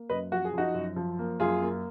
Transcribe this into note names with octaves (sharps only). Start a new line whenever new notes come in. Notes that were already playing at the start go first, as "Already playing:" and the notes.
Already playing: A#3
F#2 B4 D#5
F3 F#4
G#4
F3 D#4 F#4
F#2
F3
A#3
F#2 F4 G#4
A#3